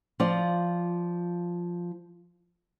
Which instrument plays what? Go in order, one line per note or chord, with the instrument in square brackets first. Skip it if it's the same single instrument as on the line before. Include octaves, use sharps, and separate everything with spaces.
[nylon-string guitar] F3 F4 D5